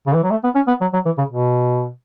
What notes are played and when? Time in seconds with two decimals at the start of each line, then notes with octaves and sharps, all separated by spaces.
0.07 C#3
0.15 E3
0.23 F#3
0.30 A3
0.44 B3
0.55 C#4
0.67 B3
0.81 F#3
0.93 F#3
1.05 E3
1.18 C#3
1.30 B2